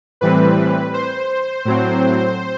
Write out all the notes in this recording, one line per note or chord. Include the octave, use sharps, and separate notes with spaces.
A2 E3 G3 C4 B4
C5
A2 F#3 C4